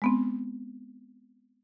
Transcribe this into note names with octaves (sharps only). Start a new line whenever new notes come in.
G#3 B3 C4